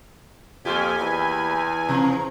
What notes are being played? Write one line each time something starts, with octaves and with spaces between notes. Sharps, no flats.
F2 A#3 F4 G4 G#5
E2 B5
C3 F3 A#5